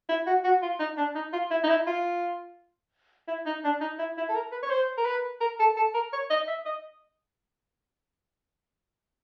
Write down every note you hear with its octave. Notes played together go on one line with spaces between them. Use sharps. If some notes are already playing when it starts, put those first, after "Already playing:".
E4
F#4
F#4
F4
D#4
D4
D#4
F4
E4
D#4
E4
F4
E4
D#4
D4
D#4
E4
E4
A4
A#4
B4
C#5
C5
A#4
B4
A#4
A4
A4
A#4
C#5
D#5
E5
D#5